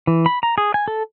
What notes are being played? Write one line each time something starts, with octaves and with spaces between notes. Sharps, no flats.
E3
B5
A#5
G#4
G#5
A4